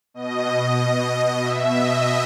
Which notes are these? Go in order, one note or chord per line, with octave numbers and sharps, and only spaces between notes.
B2 D#5
B2 E5
D#5